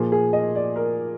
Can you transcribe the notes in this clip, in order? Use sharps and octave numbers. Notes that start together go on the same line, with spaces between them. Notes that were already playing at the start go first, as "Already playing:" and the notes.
Already playing: A#2 F3 A#3 G#4
G#4
D#5
D5
A#4